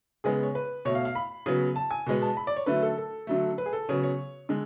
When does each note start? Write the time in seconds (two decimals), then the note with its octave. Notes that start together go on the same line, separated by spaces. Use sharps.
0.24 C#3 G#3 B3 G#4
0.43 C#5
0.55 B4
0.85 B2 A3 C#5
0.95 F5
1.05 F5
1.15 B5
1.46 C#3 F#3 B3
1.76 A5
1.91 G#5
2.06 B2 G#3 B3
2.22 A5
2.37 B5
2.47 D5
2.56 C#5
2.66 D3 F#3 A3 B4
2.82 A4
2.97 A4
3.27 D3 F#3 A3
3.58 B4
3.66 G#4
3.73 A4
3.89 C#3 F#3 B3 C#5
4.03 C#5
4.49 D3 G#3